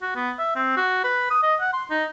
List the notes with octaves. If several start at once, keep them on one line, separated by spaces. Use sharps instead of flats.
F#4
B3
E5
C4
F#4
B4
D#6
D#5
F#5
C6
D#4